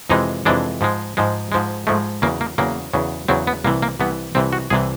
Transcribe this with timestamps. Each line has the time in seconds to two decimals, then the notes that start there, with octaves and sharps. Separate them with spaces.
0.10 F2 C3 E3 G#3 D#4
0.45 F2 C3 E3 G#3 D4
0.81 G#2 F3 G#3
1.17 G#2 F3 G#3
1.52 G#2 F3 G#3
1.87 G#2 F3 G#3 A3
2.22 E2 C#3 F#3 A#3
2.41 A#3
2.58 E2 C#3 F#3 A#3
2.93 E2 C#3 F#3
3.28 E2 C#3 F#3 C4
3.47 B3
3.64 C2 C3 E3 A#3
3.82 A#3
4.00 C2 C3 E3 B3
4.35 C2 C3 E3 C4
4.53 F#4
4.70 C2 C3 E3 G#4